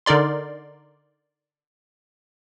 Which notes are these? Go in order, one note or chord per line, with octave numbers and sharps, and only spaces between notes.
D3 D#4 A#4 D5 C6